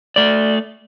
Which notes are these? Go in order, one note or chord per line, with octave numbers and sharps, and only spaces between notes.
A3 D5